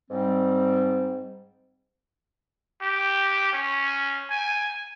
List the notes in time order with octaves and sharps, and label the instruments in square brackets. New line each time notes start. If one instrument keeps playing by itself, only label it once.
[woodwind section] G#2 G3 C4
[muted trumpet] G4
C#4
G#5